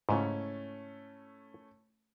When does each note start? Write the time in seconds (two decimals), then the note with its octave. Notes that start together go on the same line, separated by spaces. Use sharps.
0.09 G#2 C#3 A3 C#4 E4